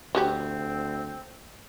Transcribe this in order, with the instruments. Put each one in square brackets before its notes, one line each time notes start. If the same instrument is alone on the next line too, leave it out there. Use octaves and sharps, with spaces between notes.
[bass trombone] D2 [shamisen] G3 F#4 G4 [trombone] C4